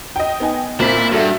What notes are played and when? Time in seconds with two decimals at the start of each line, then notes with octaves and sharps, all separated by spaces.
0.16 D#5 G5
0.40 B3 D#4 G#5
0.80 A#2 C4 E4 B6
1.12 G2 F#4 A4 E5